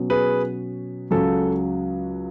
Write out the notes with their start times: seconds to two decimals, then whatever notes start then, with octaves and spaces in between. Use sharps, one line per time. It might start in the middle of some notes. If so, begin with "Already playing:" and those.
Already playing: B2 F#3 C#4
0.10 G#4 B4
1.11 C#2 C#3 F#3 A4